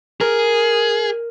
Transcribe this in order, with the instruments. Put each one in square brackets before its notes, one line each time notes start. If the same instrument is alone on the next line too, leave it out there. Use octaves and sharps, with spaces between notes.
[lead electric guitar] G#4 [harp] A#4